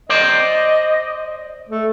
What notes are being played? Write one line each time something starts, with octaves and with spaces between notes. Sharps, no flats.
C5 D5 D#5
A3